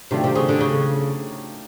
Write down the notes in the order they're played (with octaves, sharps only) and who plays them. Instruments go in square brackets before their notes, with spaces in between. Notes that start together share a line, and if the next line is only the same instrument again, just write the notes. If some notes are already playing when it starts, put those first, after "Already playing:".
[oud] C3 [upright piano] D#3 F#3 A3 D4 F4
[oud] C3
C#3
D3
C#3